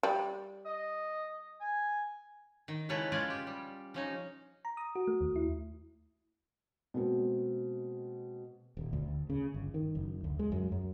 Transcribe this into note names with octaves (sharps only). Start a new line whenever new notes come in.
G3
D#5
G#5
D#3
C#3 G#3 C#4 E4 A4 B4
G#3 C#4 F4 D5 G#5
G4
G3
F3 C#4 D#4
A#5
D#6
F#4
A3
D#2
E4
B2 G#3 A#3 C4 F#4
D#1
D2
C#3
G1
D#3
F#1
D2
G#3
F#2
F#2